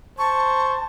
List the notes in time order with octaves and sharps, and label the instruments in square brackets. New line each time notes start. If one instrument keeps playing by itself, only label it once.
[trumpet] C5 [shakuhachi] A5 [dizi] C#6